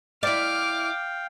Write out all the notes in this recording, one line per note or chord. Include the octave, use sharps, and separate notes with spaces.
E4 D5 F5 G5 D6 F6